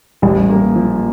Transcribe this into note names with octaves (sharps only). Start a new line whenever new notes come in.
A1 G3
A#3
F3